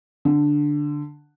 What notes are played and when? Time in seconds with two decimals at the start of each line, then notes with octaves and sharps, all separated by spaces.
0.25 D3